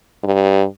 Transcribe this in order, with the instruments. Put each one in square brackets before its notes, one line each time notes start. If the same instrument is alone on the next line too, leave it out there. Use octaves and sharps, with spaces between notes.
[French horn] G2